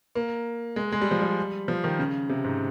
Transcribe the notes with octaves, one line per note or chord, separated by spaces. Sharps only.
A#3
G#3
G#3
G3
F3
G3
F3
D#3
C#3
C3
G#2